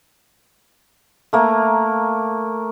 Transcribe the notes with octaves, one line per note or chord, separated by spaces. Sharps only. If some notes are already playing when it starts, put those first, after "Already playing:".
A3 A#3 A#5